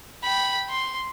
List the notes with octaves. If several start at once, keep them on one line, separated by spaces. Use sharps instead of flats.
G5 B5
C6